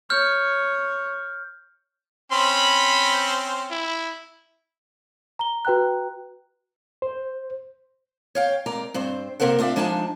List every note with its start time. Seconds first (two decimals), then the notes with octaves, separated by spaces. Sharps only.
0.10 C#5 F6 G6
2.32 C4 C#4 C5 B5
3.71 E4
5.39 A#5 G7
5.65 F#4 B4 G5 A#5 F#6
7.02 C5
8.35 C#5 F5 G5
8.66 G#2 C4 A#4 D5 A#5
8.94 G2 C4 C5
9.40 C3 A#3 C4 A#4 C5 F#5
9.59 C4 D4 F4 D5 E5
9.76 F3 G#3 D4 D#4 F#5 A5